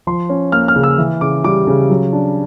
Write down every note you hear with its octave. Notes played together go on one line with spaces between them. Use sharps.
F3 C6
C#4
A#3 F6
F6
C#3
E6
E3
C#3 D6
G3 D6
C#3
F#3
D4